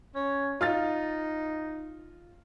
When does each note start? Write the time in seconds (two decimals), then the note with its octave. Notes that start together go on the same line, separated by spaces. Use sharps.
0.15 C#4
0.61 D#4 F4 F6 A6